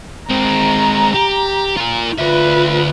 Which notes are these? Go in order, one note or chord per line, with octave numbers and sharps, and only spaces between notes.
G#3 C4 A#5
G4
F4 A#4
D2 F4 B4 E5